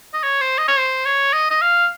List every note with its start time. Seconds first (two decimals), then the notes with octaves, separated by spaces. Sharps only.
0.13 D#5
0.23 C#5
0.41 C5
0.58 D#5
0.68 C#5
0.78 C5
1.05 C#5
1.33 D#5
1.50 D#5
1.61 F5